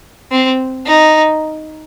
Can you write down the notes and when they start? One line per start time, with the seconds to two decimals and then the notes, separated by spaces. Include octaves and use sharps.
0.31 C4
0.86 D#4